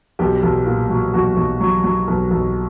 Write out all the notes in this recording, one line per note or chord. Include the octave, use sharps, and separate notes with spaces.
B1 G4
B1
A#2
F#3
B1 F#4
B1
F#3
F#3
B1
B1